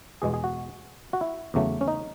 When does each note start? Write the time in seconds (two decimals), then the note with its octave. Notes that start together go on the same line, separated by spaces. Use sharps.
0.22 E2 B2 G#3 G#4
0.34 G#4
0.44 F#4
1.13 F#4
1.21 E4
1.54 E2 C#3 F#3 A3
1.81 C#4
1.88 D#4